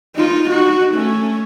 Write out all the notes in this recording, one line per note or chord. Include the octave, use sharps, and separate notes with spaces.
D#4 F4
D#4 F#4
A3 C#4